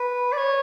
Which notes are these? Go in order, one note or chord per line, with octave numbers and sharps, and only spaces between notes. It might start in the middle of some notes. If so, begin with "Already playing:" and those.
Already playing: B4
D5
C#5